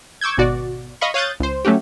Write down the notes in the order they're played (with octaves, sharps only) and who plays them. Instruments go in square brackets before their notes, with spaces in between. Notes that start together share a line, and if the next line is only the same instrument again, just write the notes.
[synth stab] C#6 D6 E6 G6 G#6
G#1 B2 F#4 D5
D#5 F5 B5 C#6
C#5 F5 D#6 F#6 G6 A6
C#2 C5
F#3 A3 C#4 F#4 G4